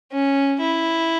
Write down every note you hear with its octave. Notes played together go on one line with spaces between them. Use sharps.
C#4
E4